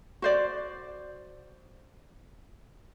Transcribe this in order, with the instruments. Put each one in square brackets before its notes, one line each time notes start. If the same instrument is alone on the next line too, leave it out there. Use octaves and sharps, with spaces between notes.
[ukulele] F#4 C5 D5